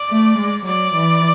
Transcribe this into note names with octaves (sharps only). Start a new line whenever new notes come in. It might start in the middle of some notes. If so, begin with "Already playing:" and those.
Already playing: D5
A3
G#3
F#3 D5
E3